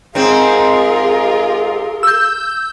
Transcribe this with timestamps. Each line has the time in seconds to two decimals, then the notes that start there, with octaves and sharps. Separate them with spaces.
0.15 G#2 C4 F4 G#4 A#4
2.03 E6 G6